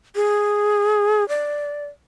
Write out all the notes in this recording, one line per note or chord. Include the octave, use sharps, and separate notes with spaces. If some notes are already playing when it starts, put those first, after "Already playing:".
G#4
D5